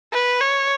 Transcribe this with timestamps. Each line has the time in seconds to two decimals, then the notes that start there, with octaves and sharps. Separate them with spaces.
0.13 B4
0.41 C#5